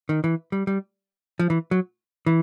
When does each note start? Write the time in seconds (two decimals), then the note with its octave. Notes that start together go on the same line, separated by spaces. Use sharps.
0.09 D#3
0.24 E3
0.52 G3
0.67 G3
1.39 F3
1.50 E3
1.71 F#3
2.26 E3